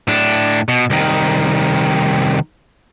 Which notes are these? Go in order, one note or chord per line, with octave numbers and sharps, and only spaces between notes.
A2 D4
B2
C2 D#3